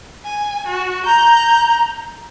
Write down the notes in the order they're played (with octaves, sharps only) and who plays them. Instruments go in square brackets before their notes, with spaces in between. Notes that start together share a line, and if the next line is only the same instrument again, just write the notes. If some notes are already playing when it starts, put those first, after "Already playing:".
[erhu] G#5
F#4
[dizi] A#5 [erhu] G6